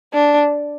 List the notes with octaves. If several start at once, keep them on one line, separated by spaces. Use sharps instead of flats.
D4